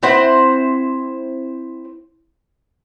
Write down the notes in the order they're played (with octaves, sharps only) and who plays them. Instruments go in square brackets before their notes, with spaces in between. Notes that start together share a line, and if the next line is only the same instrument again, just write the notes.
[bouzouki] C4 E4 C5 F#5